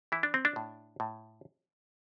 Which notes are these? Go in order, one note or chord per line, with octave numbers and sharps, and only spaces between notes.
E3 E4
D4
C4
D4
A2
A2